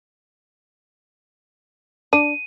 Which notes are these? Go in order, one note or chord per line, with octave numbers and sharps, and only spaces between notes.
D4 D#7